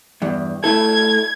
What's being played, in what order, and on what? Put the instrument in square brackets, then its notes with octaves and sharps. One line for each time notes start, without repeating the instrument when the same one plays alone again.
[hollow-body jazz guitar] E2 G2
[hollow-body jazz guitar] A3 E4 A4 [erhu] G#6